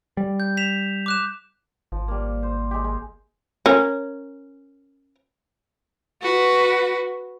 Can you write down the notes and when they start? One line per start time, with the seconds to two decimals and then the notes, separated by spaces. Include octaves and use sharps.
0.17 G3
0.40 G6
0.57 B6 E7 F7
1.06 D6 F#6 E7
1.92 G#1 F3
2.08 G3 A#3
2.43 C5
2.71 G#3 G4
2.84 G#3
3.66 C#4 A#4
6.22 F#4 B4